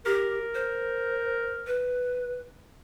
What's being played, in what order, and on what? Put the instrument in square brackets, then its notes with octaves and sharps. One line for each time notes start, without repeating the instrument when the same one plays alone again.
[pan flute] G4 [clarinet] A#4
[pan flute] C5
B4